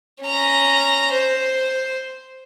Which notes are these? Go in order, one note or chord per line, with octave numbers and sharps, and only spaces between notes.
C#4 A#5
C5